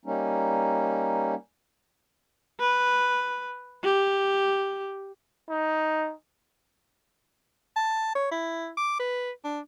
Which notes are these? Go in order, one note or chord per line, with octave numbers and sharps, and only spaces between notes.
G3 A#3 C#4 D#4
B4
G4
D#4
A5
C#5
E4
D6
B4
D4